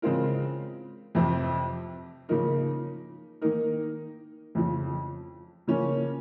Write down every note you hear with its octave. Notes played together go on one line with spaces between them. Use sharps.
C#3 G#3 C4 F4 A#4
F2 C3 F3 C4
C#3 F3 A#3 D#4 A#4
D#3 A#3 D#4 A#4
F2 C#3 F3
C#3 F3 A#3 C#4